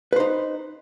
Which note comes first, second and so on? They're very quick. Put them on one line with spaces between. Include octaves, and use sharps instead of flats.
B4 C5 D#4